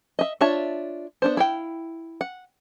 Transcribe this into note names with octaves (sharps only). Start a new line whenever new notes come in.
D#5 E5
D4 F4 C#5 E5 A5
B3 D4 C5
E4 F5 G5
F#5